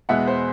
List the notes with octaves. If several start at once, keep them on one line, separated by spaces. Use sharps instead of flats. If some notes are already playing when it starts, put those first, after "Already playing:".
E2 B2 G#3 B3 E5 F#5
C5